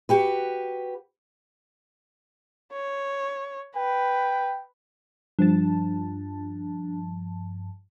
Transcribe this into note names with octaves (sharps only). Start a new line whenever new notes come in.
F#4 G4 B4
C#5
B4 G5
G2 F3 D4 A5